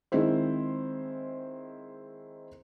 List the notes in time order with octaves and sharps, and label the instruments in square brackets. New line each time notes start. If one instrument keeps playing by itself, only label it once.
[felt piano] D#3 G#3 C4 E4 C5